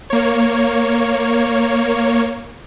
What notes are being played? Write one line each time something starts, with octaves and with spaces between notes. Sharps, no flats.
A#3 C#5